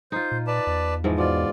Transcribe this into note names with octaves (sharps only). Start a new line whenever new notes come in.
D#4 F4 C5
A#2
B4 D5 A5
E2
G#2 E3 F3
B2 F4 D5